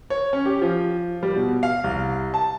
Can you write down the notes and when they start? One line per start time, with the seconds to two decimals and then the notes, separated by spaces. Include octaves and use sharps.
0.10 C#5
0.33 C#4
0.46 G4
0.62 F3
1.23 G3
1.36 B2
1.63 F5
1.84 C2
2.34 A5